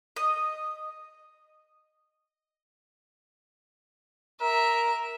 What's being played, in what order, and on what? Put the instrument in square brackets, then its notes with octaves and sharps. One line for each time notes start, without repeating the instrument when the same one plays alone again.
[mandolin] D#5
[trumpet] A#4 [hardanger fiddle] E5